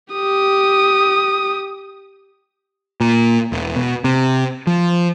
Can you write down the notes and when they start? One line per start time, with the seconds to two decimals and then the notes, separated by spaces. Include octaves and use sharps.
0.13 G4 D#6
3.00 A#2
3.52 E1
3.76 B2
4.04 C3
4.67 F3